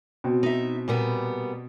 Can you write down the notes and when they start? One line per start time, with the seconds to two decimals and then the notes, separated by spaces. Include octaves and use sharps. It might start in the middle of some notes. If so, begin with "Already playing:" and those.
0.24 B2 C4
0.43 D#4 E5
0.88 A#2 G3 B3